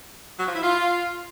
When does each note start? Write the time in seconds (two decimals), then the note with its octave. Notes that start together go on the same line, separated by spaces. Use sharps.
0.39 F#3
0.47 F3
0.55 E4
0.63 F4